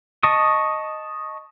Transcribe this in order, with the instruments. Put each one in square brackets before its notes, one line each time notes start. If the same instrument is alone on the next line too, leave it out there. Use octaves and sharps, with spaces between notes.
[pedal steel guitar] D#5 A5 C#6 D#6